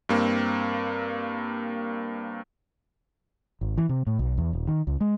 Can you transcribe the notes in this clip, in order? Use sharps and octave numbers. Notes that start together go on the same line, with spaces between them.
G2 A#3 C4
G#1
E3
C3
A2
B1
E2
D#1
D#3
C#2
G#3